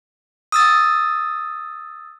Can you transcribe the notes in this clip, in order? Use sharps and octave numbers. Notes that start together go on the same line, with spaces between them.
D#6 E6 A6